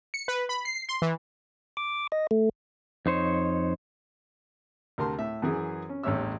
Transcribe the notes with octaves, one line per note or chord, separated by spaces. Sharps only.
C#7
B4
B5
C7
C6
E3
D6
D#5
A3
F2 D#4 C5 C#5
D2 C3 A#4 A5 C6
A2 E5
F#2 E3 G#4
C#4
A1 E2 G2 C#5 E5 E6